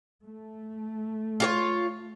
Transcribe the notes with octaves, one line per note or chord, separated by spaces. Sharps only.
A3
F4 F#4 C#5